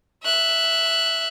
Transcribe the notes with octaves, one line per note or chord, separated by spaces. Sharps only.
E5 F#6